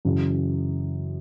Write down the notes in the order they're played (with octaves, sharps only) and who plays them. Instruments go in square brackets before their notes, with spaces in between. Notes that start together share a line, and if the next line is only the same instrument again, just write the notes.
[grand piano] F#2 C#3 E3